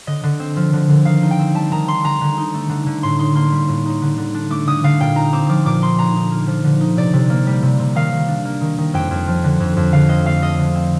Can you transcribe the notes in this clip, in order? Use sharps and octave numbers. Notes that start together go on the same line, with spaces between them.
D3 D#5
D3
C4
F3
D3
D3
D#3 F5
D#4
G5
C4
G3 A5
D#3 A#5
D#4 C6
D3 A#5
D3
D#4
A3
D3
D3
A2 C6
D#4 C6
A#3 C6
G3
A2
D#4
D3
D3
D4
A3 D6
D3 D#6
D3 F5
A#2 G5
D#4 A#5
C4 D6
F3 D6
A#2 D6
D#4 C6
D3 A#5
D#4
A#3
F3
D3
D#4
C3 D5
C3
A#3
G3
C3
C3
D#3 F5
D#3
D4
A#3
D#3
D#3
F2 G5
F2
F3
D3
F2
F2
D3 F5
C4 D#5
A3 F5
F3 D#5
D3
C4